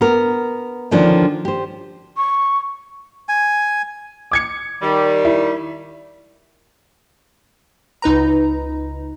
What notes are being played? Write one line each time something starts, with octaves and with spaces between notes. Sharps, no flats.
B3 A#4
D3 D#3 F3 C#4 D4
G4 C5
C#6
G#5
D6 G#6 C#7
D#3 G3
E4
C#2 D#4 B4 A#5